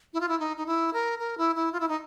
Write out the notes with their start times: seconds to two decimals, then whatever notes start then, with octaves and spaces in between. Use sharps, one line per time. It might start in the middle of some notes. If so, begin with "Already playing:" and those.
0.13 E4
0.21 F4
0.28 E4
0.40 D#4
0.57 D#4
0.66 E4
0.93 A#4
1.19 A#4
1.38 E4
1.55 E4
1.72 F4
1.80 E4
1.89 D#4